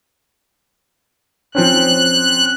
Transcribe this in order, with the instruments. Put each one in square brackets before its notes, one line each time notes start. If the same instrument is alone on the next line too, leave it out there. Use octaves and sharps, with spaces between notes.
[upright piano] F3 C4 C#4 [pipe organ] F#6